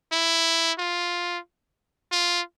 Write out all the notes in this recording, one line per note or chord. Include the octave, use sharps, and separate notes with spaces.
E4
F4
F4